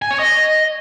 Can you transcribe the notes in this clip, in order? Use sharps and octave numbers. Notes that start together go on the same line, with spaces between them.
G#5
C#5
D#5